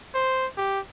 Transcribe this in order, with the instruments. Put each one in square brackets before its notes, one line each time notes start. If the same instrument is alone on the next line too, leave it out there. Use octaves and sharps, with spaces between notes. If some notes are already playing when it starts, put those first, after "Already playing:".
[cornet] C5
G4